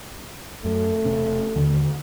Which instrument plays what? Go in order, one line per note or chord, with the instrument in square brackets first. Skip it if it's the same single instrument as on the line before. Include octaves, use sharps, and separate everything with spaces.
[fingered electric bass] F#2 [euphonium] A3
[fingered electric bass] E1 C3 C#4
D#2 D3